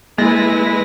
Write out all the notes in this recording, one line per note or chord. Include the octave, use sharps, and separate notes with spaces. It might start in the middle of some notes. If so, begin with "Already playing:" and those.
G#3 A#3 E4 B4 A#6